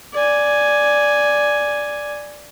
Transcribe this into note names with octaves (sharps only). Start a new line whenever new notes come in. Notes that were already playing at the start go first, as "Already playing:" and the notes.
D5 G#5